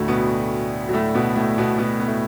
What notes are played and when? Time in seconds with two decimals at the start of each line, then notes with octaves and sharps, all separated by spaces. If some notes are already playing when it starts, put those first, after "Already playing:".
Already playing: D2 A2 D3 A3 F#4
0.08 B2 B3
0.89 F#3
0.93 A2 A3
1.14 B2 B3
1.36 A2 A3
1.58 B2 B3
1.78 B2 B3
1.99 B3
2.07 A2 A3